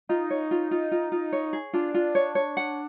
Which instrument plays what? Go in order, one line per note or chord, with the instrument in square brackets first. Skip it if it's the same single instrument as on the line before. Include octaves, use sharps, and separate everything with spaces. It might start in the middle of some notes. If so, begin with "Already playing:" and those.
[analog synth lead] D#4 [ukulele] F4
[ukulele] C#5
F4
F4
F4
F4
C#5
G#4
[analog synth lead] D4 [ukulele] F4
[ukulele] F4
C#5
C#5
F#5